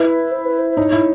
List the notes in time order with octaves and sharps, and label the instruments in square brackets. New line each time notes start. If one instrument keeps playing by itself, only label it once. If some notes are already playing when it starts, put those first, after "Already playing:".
Already playing: [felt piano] E4 [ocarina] B4
[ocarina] C5
B4
C5
C5
[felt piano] D#4 [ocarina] C#5
[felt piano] E4